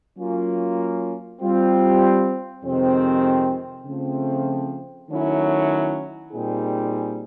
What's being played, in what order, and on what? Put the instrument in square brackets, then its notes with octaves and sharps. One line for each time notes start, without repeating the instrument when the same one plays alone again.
[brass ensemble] F#3 A#3 C#4 F4
G3 C4 F4
F2 C3 D#3 G#3 C4
C#3 F3 A3 C4
D#3 F#3 A3 C#4 E4
A#2 G3 C4 D#4 G#4